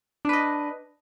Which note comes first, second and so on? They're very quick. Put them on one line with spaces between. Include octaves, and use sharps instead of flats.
D4 B4 D#5